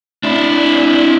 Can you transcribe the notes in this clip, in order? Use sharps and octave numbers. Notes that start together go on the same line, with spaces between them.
D4 E4